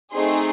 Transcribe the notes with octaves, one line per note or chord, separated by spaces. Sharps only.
A3 C4 D#4 G#4 C6